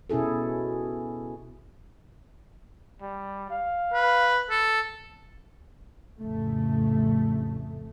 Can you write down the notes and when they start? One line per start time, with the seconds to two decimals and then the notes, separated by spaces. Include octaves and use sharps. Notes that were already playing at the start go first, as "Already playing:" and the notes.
0.10 B2 C#4 E4 G#4 A4
3.01 G3
3.50 F5
3.93 B4
4.50 A4
6.20 A1 F2 C#3 A3